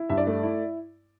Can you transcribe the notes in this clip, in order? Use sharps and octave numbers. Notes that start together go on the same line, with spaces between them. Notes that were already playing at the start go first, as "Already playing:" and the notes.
Already playing: E4
G2 E5
D5
A3
E4